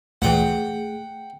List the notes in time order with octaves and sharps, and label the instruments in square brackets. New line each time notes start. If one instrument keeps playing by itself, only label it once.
[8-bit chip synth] D2 A#2 E3 [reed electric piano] A3 G#4 [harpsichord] F#5 G5